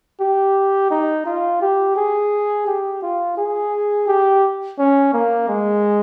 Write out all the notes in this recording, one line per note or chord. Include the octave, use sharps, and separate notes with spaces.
G4
D#4
F4
G4
G#4
G4
F4
G#4
G4
C#4
A#3
G#3